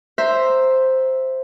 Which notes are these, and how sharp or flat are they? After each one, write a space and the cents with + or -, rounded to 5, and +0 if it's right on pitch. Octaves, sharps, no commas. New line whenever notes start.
C5 +0 E5 +0 A#5 +0